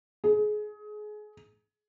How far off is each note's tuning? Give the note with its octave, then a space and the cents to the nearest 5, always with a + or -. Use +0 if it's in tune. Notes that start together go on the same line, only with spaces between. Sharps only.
G#4 +25